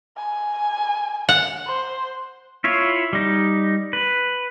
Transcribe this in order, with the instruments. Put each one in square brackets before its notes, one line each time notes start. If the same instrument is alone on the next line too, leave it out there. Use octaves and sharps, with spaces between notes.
[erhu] G#5
[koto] F#5
[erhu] C5
[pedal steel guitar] E4 F4 C#5
G3 D#4
B4